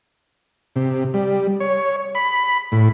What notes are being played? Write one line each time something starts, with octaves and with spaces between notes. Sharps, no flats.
C3
G3
C#5
B5
A2